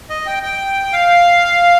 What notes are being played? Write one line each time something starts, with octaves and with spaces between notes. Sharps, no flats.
D#5
G5
G5
F5